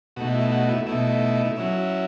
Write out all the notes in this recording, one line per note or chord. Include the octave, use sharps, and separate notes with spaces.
B2 A3 D#4 F#4
E4
F#4
E4
B2 A3 D#4 E4
F#3 C#4 E4